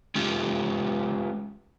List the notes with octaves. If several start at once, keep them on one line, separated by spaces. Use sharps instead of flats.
G#3 C#4 F4 G4